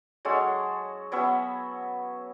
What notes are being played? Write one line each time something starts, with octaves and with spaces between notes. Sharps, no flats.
F#3 G#3 C#4 A4
F#3 B3 C#4 E5